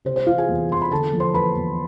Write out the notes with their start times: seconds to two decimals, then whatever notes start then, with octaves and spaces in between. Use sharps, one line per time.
0.05 C3 C5
0.16 C5
0.26 E3 F4 F5
0.38 G#4 G#5
0.49 E2
0.70 E2 C6
0.82 B5
0.91 D3 A4 A5
1.13 F3
1.20 C5 C6
1.34 E2 B4 B5
1.55 E2